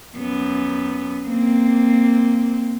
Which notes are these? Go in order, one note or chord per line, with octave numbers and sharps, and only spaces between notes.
F#2 B3
A#3 C4